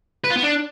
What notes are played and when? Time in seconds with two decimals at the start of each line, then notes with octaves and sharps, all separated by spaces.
0.24 B4
0.30 F4
0.37 B3
0.43 D4